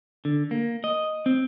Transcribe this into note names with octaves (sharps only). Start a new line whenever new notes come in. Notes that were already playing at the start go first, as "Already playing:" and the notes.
D3
A#3
D#5
C4